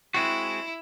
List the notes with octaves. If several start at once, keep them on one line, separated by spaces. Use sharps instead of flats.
G#3 C4 E4 F#4